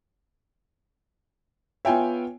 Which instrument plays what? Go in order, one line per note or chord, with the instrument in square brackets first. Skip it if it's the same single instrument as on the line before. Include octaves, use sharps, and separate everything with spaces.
[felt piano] B3 F4 C#5 [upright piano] E5 G5 G#5